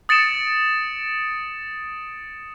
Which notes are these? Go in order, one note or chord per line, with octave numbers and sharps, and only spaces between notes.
D#6 A6 C#7 D7 E7